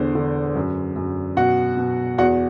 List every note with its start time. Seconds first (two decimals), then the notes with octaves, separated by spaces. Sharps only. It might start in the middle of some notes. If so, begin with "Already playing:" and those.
Already playing: E2 D3 C5
0.15 D3
0.56 F#2
0.96 F#2
1.37 B2 F#4 F#5
1.77 B2
2.18 E2 F#4 F#5